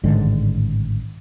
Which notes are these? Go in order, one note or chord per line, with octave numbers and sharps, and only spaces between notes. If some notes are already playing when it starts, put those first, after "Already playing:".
A1 G#2 D3 D#3